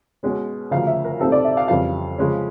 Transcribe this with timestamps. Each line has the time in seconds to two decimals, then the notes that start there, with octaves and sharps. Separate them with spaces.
0.23 B2 G#3 C#4
0.71 D2 C#3 F3 A#3 F5
0.87 E5
1.04 A#4
1.20 C2 A#2 G3 C4 D#4 A4
1.32 D5
1.44 E5
1.57 F5
1.68 F2 C#3 E3 G3 F5
2.18 C#3 F3 G#3 C#4